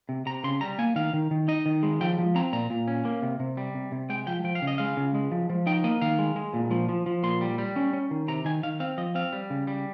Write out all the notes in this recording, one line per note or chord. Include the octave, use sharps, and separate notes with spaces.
C3
C3 A#5
C#3 C6
G3 A#5
A#3 G#5
D#3 F5
D#3
D#3
D#4 D#5
D#3
G#3
F3 G5
F3
C4 A#5
A#2 A#5
A#2
C#4
A#3
C3
C3
G3
C3
C3
G#3 G5
F3 G5
F3 G5
F5
C#3
D#5
G#3 F5
C#3
G#3
F3
F3
D#4 G5
A#3 D#5
D#3 F5
G#3
G#3
A#2
F3
F3
F3
A#2 C6
G3
G3
C#4
C#4
D#3
C3 A#5
D#3 G#5
D#3 F5
C4 F5
F3 D#5
C4 F5
G3
C#3
G3